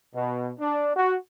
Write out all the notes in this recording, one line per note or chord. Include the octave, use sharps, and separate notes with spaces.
B2
D4
F#4